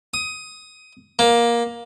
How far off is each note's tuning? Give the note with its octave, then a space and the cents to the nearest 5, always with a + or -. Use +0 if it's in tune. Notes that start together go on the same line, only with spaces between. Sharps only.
D#6 +15
A#3 +15